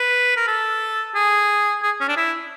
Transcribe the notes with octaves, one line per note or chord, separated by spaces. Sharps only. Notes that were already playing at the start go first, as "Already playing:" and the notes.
Already playing: B4
A#4
A4
G#4
G#4
C#4
D4
E4